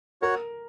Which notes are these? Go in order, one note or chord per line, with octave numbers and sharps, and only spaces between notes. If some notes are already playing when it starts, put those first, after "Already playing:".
F#4 A#4 C#5 F#5